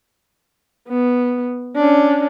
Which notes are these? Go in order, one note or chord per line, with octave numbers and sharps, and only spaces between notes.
B3
C#4 D4